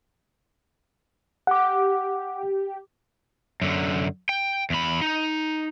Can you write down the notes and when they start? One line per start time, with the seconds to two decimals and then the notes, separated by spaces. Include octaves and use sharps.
1.47 G4 F#5 D6
3.62 F#2 D3
4.29 G5
4.70 E2 B5
5.02 D#4